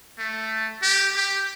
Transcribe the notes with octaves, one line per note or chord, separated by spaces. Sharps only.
A3
G4
G4